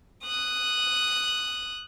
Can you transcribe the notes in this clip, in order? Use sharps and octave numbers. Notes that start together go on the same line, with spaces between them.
D#6 F#6